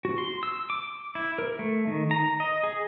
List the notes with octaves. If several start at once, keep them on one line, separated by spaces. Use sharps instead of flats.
F#4
C6
E6
D6
E4
A#4
A3
D#3
A#5
D#5
G#4